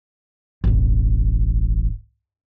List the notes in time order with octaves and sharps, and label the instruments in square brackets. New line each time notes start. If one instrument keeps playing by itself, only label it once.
[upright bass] E1 A1